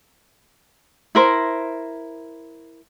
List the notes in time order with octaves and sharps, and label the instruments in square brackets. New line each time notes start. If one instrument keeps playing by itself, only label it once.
[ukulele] E4 A#4 C5